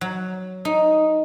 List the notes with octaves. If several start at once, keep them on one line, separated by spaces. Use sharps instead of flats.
F#3
D#4